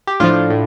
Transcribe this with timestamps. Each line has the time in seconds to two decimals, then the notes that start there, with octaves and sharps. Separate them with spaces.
0.07 G4
0.20 A2 F3 D4 F4
0.50 A2